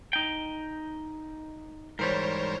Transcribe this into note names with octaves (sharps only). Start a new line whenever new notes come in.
D#4 G5
G#2 E3 G3 A#4 C5 C#5